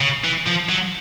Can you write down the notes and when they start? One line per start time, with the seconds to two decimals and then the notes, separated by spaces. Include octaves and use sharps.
0.01 C#3
0.24 E3
0.47 F3
0.69 F#3